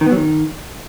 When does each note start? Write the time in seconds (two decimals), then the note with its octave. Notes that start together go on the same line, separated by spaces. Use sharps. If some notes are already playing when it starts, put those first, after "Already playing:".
0.01 D#3
0.06 B3
0.11 F#3
0.16 D#3